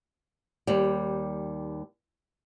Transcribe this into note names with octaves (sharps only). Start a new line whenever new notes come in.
D#2 G3